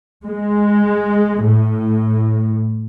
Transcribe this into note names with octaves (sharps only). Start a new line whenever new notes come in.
G#3
A2